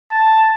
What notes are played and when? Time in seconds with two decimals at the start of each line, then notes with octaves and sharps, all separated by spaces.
0.12 A5